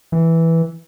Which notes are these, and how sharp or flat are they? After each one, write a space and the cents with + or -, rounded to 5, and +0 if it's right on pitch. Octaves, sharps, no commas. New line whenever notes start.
E3 -5